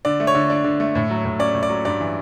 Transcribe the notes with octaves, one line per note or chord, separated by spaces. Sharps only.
D3 D5
A3
C#5
D3
D4
D3
A3
A2
F#3
A2
C#4 D5
A2
D5
F#3
G2 D5
E3